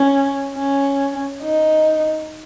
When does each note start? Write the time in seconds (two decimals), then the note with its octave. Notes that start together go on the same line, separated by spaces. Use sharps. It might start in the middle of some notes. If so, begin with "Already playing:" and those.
Already playing: C#4
0.55 C#4
1.43 D#4